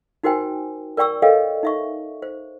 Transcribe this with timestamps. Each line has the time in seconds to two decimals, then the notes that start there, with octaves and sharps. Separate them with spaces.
0.23 D#4 F#4 A#4 C5 G5 G#5
0.97 A#4 D5 G5 C#6 E6
1.22 A4 A#4 C#5 D#5 F5 G5
1.63 D#4 E5 C#6
2.22 C5